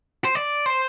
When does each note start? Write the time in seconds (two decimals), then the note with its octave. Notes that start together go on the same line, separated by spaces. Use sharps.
0.25 C5
0.35 D5
0.66 C5